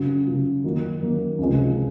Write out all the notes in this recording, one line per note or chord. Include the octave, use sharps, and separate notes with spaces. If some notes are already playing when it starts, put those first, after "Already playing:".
Already playing: F#2 C#3 F#3
F#2 C#3 F#3
D#3 F#3 A#3
D#3 F#3 A#3
C#2 C3 F3 G#3